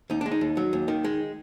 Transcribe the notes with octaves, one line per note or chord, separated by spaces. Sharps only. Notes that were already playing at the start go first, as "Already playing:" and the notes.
D#2 D#4
G#3 D4
D#4
D#2
F#3
D#2
D#3
G#3